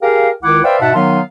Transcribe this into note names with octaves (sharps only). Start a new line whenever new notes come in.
G4 G#4 A#4 F5
C#2 D#3 E4 F#5 D6
B4 C5 D5 E5 F5 G5
G#2 B2 E5 F#5 A5
D#3 F#3 B3 D#4 F5 C6